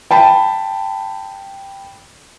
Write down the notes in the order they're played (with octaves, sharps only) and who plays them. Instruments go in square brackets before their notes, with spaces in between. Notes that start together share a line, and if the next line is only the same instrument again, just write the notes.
[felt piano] G5 A5 B5